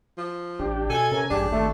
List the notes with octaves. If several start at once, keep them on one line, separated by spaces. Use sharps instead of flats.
F3
A1 D4 G4
B2 A4 G#5
C3 C#4 A#4
A1 G2 D4 G4 G#4
G#1 A3 A4